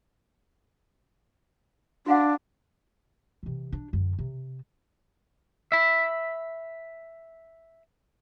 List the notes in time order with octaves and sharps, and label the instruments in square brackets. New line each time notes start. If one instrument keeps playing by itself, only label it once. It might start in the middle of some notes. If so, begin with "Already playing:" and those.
[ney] D4 [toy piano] F#4 F5 F#5
[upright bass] C3 E3
D4
F#2 D3
C3
[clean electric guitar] E5 B5